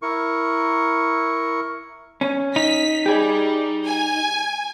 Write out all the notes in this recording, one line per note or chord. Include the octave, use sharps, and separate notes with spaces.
E4 A#4 C#6
C#4
D#4 B6
G3 G4 G#4
G#5